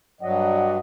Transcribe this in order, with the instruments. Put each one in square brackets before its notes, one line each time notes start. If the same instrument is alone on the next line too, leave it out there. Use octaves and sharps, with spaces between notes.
[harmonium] G2 F#3 [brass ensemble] D5 D#5 F#5